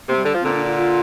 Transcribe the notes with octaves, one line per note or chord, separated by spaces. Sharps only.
C3 A#3
G3
D3
F3
A#2 D3 C4
D4
F4
F4